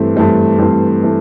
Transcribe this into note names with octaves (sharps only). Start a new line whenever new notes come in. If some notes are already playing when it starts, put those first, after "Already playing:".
Already playing: G2 E3 A3 C4
G2 E3 A3 C4
G2 E3 A3 C4
E3 A3